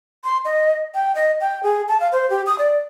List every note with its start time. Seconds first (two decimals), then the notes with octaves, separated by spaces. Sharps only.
0.24 C6
0.45 D#5
0.94 G5
1.15 D#5
1.40 G5
1.63 G#4
1.88 A5
2.00 F5
2.12 C5
2.30 G4
2.46 D#6
2.58 D5